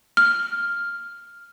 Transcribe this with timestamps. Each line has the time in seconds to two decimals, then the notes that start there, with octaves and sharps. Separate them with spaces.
0.17 F6